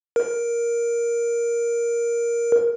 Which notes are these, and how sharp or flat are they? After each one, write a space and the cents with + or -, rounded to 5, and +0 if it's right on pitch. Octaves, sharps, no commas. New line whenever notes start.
A#4 +10